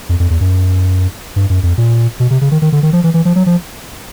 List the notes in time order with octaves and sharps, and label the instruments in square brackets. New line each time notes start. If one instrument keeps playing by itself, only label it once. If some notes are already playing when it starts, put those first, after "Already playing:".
[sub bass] F2
F2
E2
F#2
G2
F#2
F2
A#2
B2
C3
C#3
D#3
D#3
D3
D#3
F3
E3
E3
F3
F#3
F3